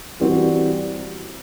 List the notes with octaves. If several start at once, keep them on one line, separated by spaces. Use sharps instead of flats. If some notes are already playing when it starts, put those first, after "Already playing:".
E3 G3 C4 F#4